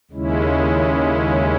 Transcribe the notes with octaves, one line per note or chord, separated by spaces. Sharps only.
D#2 C#3 G#3 C#4 E4